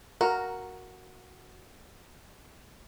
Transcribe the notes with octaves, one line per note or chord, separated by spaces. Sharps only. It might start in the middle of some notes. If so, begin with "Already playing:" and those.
F#4 A#4 A#5